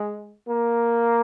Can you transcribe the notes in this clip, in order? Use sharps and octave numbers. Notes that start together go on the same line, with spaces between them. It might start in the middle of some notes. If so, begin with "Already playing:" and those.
Already playing: G#3
A#3